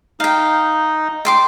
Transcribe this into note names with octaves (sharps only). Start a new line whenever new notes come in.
D#4 F5 G5
G5 C6 D6